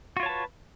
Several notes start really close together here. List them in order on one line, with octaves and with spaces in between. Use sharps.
F#4 F4 C#5 A5 B4